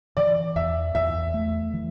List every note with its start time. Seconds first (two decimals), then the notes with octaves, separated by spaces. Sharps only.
0.17 E3 D5
0.56 E2 E5
0.95 E2 E5
1.34 A3
1.74 E3